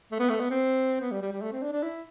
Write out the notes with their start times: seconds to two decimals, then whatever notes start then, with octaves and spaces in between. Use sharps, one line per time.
0.12 A3
0.20 B3
0.30 A3
0.40 B3
0.51 C4
1.01 B3
1.11 G3
1.22 G3
1.32 G3
1.42 A3
1.52 C4
1.62 D4
1.73 D4
1.83 E4